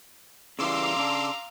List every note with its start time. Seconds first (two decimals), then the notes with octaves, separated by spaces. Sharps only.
0.59 C#3 E3 G3 F5 A#5 C6 D6 E6
0.96 C#3 D4